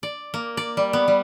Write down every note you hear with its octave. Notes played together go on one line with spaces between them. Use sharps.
D5
A#3
D5
G3
B3
G3